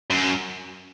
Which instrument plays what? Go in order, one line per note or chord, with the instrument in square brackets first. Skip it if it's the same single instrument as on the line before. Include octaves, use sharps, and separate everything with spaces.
[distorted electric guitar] F#2